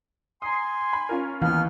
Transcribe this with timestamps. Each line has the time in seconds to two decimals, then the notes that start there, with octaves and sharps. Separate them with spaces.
0.42 G#5 A#5 C6 D#6
0.93 B5
1.09 C#4 F4 A#4
1.42 D#2 E3 B3 F6